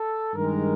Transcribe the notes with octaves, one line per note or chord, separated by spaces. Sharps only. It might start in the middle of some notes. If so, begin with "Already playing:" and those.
Already playing: A4
G2 D#3 G#3 A#4